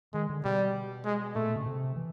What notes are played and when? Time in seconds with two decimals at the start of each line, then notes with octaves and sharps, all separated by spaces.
0.14 D#3 G#3
0.29 D3
0.45 B2 G3
1.05 G#3
1.35 A#2 A3
1.56 C#3
1.66 C3
1.96 E3